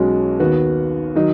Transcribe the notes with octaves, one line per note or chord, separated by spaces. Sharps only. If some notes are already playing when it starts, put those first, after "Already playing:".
Already playing: B1 B2 G#3 C#4 F#4
D#2 D#3 B3 F#4
D#3 F#3 D#4